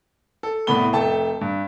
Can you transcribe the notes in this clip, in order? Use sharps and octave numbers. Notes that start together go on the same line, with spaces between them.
A4
C2 A2 B3 B5 G7
F1 A3 A4 G5 A5
G2